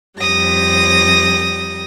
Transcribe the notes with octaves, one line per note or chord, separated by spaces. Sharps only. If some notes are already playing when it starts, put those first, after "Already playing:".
F2 G3 D#6 A#6